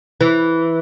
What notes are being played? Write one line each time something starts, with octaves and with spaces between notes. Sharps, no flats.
E3